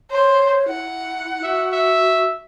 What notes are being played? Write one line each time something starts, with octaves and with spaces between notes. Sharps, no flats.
C5 C#5
E4 F#5
F#4 E5
E5